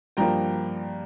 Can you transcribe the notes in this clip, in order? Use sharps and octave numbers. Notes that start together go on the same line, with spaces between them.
G2 F3 A#3 G5 A#5